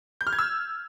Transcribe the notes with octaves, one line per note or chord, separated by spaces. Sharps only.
G6
F6
G#6
E6